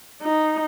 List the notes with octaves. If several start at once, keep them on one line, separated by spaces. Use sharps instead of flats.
D#4